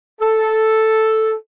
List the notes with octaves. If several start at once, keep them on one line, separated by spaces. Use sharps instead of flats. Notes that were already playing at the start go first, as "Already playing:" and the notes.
A4